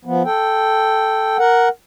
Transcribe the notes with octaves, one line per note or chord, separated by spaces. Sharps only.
F3 B3
A4 G5
A#4 F#5